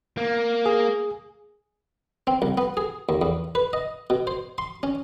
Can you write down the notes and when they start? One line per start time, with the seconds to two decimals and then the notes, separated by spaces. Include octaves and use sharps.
0.17 A#3
0.66 G#4
2.27 C4
2.42 C2
2.58 B3
2.77 G#4
3.09 D#2
3.22 E2
3.55 B4
3.73 D#5
4.10 B2
4.27 C5
4.58 C6
4.83 C#4